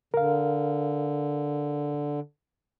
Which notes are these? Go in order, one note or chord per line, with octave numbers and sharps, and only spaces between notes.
D3 A#4 F5